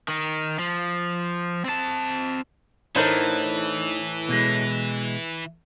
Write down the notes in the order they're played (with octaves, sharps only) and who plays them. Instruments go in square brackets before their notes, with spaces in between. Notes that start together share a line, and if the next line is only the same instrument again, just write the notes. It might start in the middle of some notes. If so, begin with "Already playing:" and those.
[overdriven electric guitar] D#3 D#4
F3
C4 A5
[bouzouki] A2 [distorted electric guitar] E3 [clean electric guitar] D4 D#4 [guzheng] A#4 C5 F#5
[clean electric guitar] B2 G#3